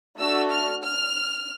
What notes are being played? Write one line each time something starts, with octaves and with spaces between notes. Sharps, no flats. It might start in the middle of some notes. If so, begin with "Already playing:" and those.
A3 D4 F#4 A4 E6
F6
F6